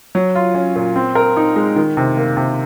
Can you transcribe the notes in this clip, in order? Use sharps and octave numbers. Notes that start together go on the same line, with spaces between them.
F#3
F4
C#4
A#2
C4
A#4
D#4
G#3
D#3
C3
A#3
C3